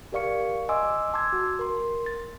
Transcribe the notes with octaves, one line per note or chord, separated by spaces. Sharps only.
G4 A#4 D5 F5 C#6 C#7
D#5 G#5 C6 D6 E6
A5 C6 D6 E6 G#6
F#4
A#4 C6
A6